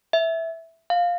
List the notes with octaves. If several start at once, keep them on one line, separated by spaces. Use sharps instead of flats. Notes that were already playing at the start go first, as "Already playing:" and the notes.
E5
F5